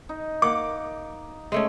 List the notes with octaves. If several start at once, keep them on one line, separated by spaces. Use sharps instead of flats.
D#4
A#3 F#5 D6
G#3 A3 C#4